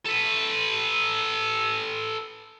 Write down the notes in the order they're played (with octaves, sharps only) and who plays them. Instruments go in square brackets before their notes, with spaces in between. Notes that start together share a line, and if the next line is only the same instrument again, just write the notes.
[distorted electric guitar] A4 B4